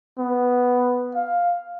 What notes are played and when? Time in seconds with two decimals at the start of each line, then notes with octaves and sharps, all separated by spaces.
0.19 B3
1.15 F5